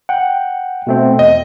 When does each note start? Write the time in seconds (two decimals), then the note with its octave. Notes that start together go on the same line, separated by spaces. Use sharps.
0.09 F#5 G5
0.87 B2 A3 C4
1.19 E2 D#5